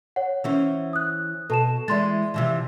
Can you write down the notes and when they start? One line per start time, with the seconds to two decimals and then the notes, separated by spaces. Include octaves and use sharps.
0.16 C#5 F#5
0.44 E3 C#4 C5
0.93 D#6 F#6
1.50 B2 A4 A5 E7
1.88 E3 G#3 D5 C6 A6
2.34 C3 E3 F3